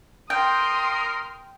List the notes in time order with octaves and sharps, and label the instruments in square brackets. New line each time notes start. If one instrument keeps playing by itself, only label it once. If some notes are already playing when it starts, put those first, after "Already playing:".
[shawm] A#4 [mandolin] G5 [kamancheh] C6 D#6